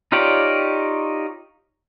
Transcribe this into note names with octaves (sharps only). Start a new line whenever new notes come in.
D#4 F4 G4 C#5 D5